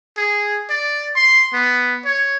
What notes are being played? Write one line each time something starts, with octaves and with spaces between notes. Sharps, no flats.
G#4
D5
C6
B3
C#5